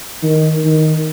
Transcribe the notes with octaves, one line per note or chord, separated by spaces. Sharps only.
D#3
D#3